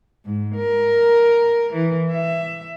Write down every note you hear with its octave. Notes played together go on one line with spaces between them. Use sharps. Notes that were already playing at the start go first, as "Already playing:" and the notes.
G#2
A#4
E3
E5